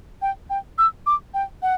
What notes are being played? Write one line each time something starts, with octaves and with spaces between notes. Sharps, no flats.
G5
G5
E6
D6
G5
F#5